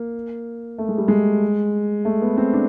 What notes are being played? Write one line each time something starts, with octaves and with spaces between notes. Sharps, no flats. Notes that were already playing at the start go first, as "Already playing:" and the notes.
Already playing: A#3
A3
G#3
G3
G#3
A3
B3
C4
D4